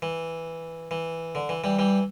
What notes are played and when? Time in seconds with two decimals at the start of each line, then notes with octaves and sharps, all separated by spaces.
0.02 E3
0.91 E3
1.35 D3
1.49 E3
1.64 E3 G3
1.79 E3 G3